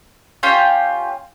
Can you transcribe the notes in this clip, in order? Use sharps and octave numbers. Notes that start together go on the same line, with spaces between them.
C#4 F4 G4